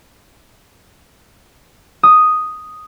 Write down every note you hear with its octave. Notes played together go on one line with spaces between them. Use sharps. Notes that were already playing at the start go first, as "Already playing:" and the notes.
D#6